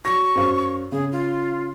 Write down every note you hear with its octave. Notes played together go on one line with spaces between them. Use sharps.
F#3 C#6 A#6
F#2 C5 F5
C#3 G#4
F4